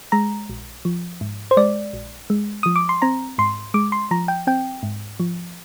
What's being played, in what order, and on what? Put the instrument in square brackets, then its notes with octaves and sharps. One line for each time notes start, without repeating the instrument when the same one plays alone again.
[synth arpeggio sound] G#3 A#5
A#1
F3
G#2
C5
G#3 D5
A#1
G#3
F3 D#6
D6
C6
C4 A#5
G#2 C6
G#3 D6
C6
F3 A#5
G5
C4 G5
G#2
F3